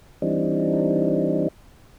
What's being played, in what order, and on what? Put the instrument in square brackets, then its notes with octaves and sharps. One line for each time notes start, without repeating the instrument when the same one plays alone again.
[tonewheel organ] E3 G3 C4 D4 D#4